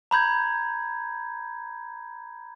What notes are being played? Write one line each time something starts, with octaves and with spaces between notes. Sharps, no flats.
A#5 B5 G6 G#6